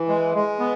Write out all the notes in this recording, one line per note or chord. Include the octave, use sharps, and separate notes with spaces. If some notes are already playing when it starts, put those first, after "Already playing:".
Already playing: E3
G#3
G#3
B3